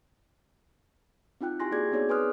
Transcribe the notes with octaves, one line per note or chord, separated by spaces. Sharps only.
C4 D#4 F4 G5 F#6
E4 G4 G#5 C6 A#6
A#3 F#4 G#4 D5 G#6
B3 C4 D#4 G#4 C#5 D5
B4 G#5 C6 D#6 F6 F#6